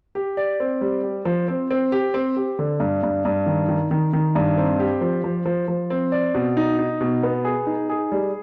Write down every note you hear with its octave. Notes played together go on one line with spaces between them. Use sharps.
G4
D5
C4
G3
G4
F3
C4
C4
G4
C4
G4
D3
G2
G2
G2
D#3
D#3
D#3
D#3
G2
C4
G4
F3
F3
F3
F3
C4
D5
B2
D#4
D#4
B2
B3
G#4
D#4
G#4
G3